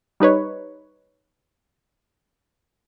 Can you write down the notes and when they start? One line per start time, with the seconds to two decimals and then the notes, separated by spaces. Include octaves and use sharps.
0.20 G3 D#4 B4 C#5